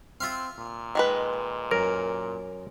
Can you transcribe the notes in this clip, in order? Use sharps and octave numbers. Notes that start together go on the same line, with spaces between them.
C4 F4 E5 F5
A#2
D#3 G#3 B4
F#2 A#4